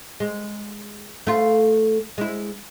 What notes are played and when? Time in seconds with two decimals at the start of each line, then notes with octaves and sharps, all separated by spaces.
0.20 G#3
1.27 A3 F4
2.18 G#3 E4